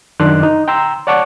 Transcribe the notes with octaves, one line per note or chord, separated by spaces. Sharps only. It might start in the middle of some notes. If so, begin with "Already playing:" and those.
F#2 D#3 D4 C6 D6 F#6
D#4
G5 A#5 C6 E6
C#5 D5 F#5 A5 C#6 D6